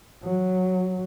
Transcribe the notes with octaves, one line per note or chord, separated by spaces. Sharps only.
F#3